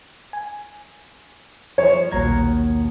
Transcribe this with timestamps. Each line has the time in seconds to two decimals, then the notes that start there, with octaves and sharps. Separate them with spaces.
0.33 G#5
1.78 F3 C#5
2.12 A#1 D#2 B2 A#3 A#5 G#6